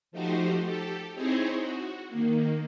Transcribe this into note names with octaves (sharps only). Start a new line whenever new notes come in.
F3 A3 D#4 F#4 G4 C5
G4 A4
C4 D#4 E4 G#4 C5 C#5
F#4
D#3 A#3